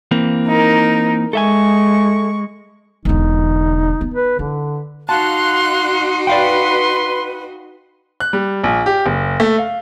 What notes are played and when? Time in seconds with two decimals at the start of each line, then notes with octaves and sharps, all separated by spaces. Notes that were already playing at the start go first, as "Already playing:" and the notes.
0.11 E3 A#3 C4
0.47 D#4 A#4
1.33 G#3 A4 E5 G#5 C#6
3.05 E1 D3 D#4
4.01 B3
4.14 B4
4.39 D3 E4
5.09 D#4 F#4 F5 A5 C6 F#6
6.27 B4 D5 F5 G5 C6
8.20 F#6
8.33 G3
8.64 A#1
8.86 G4
9.06 F#1
9.40 A3
9.58 F5